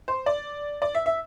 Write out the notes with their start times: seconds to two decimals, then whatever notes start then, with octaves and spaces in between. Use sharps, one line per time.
0.08 C5
0.26 D5
0.82 D5
0.95 E5
1.06 E5